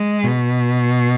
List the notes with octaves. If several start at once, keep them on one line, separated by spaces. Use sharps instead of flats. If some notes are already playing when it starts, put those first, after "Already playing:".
Already playing: G#3
B2